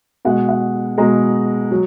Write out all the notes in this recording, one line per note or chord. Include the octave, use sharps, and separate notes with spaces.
B2 G#3 F#5
F#5
B2 G#3 A#5
F#3